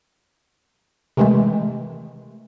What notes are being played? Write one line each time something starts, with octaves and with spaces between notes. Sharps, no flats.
C3 D#3 E3 G#3 A3